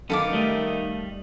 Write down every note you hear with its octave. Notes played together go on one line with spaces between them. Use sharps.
F#2 D#3 B3 A4 F5 D6
G3 A3 D#5